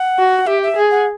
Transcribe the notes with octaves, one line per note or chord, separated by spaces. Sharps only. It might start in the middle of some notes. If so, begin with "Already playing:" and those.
Already playing: F#5
F#4
G4 E5
E5
G#4
F#5